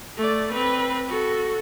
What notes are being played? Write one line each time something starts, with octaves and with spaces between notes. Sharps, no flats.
A3 D5
C4 B4
F#4 A4